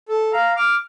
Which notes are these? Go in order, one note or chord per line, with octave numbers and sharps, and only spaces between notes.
A4
F5 A#5
D6 F6